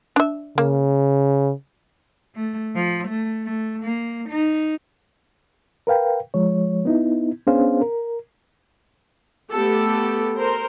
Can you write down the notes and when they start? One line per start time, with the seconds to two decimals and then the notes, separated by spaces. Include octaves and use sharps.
0.16 D4 E5
0.58 C#3 A#3
2.34 A3
2.75 F3
3.08 A3
3.43 A3
3.82 A#3
4.30 D#4
5.87 A#4 B4 F5 G5
6.34 F3 G#3 C#5
6.85 B3 D#4 E4
7.47 B3 C#4 D4 G#4 C5 F5
7.81 A#4
9.51 A3 B3 G4 A4
10.36 A#4 C5